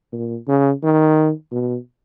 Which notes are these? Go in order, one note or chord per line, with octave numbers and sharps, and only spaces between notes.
A#2
C#3
D#3
B2